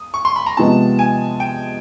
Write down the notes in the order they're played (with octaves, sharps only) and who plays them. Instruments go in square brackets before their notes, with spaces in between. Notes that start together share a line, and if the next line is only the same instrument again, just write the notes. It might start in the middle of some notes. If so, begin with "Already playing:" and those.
Already playing: [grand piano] D#6
C#6
C6
B5
A#5
[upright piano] C3 F3 G#3 B3 [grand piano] A5
[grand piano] G#5
G5